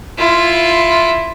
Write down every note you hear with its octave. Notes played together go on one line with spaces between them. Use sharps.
E4 F4